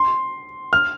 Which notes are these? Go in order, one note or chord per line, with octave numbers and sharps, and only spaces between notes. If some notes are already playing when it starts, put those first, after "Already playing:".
Already playing: C6
F6